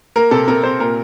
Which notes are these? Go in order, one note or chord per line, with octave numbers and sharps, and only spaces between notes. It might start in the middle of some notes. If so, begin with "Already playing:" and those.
A#3 A#4
C3 A4
C3 A#4
C3 C5
A#2 A#4